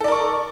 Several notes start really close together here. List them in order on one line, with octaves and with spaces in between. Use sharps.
A4 D5 A#4 C#6